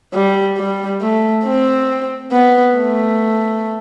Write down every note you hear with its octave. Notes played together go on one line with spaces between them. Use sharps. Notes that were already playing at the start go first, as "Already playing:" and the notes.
G3
G3
A3
C4
B3
A3